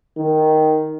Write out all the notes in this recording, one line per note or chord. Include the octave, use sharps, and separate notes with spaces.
D#3